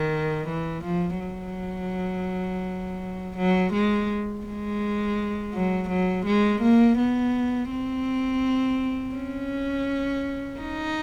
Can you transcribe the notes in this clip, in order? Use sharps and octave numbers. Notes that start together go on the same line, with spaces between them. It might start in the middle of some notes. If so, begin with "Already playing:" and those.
Already playing: D#3
E3
F3
F#3
F#3
G#3
G#3
F#3
F#3
G#3
A#3
B3
C4
C#4
D#4